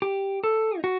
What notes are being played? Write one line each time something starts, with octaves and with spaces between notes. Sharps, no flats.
G4
A4
D#4
F#4